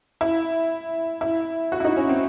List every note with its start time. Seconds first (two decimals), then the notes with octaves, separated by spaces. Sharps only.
0.21 E4
1.21 E4
1.72 F#4
1.80 E4
1.84 D#4
1.97 C#4
2.09 C4